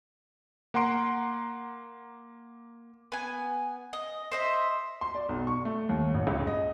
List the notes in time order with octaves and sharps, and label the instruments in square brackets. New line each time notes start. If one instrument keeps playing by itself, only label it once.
[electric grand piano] A#3 F#5 A#5 C6 D7
[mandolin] B3 G#5
D#5
C5 D#5 E5
[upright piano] C6
D5
B1
C#6
A3
D#2
A1
C#2
D#5